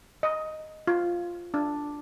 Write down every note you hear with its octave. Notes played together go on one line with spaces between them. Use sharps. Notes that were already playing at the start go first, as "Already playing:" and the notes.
D#5
F4
D4